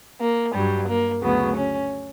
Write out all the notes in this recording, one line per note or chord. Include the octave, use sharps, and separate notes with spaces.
A#3
G2 F#3 G3
A#3
D2 C#3 F#3 B3
C#4